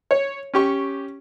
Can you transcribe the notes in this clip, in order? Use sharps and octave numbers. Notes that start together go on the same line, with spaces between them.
C#5
C#4 G4 C#6